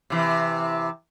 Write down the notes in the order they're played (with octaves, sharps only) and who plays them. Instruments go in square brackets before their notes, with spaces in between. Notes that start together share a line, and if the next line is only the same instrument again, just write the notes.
[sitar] C3 E3